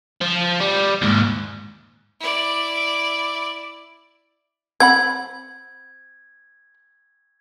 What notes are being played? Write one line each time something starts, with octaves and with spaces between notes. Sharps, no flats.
F3
G3
D#2 G#2
E4 D5
C4 F#5 B5 G#6